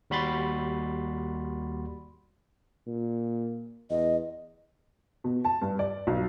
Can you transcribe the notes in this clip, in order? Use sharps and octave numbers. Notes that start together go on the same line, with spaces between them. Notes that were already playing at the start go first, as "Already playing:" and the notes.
D#2 G3 F#4 B5 C6 A6
A#2
E2 D#5
B2
A5
G2
D5
B1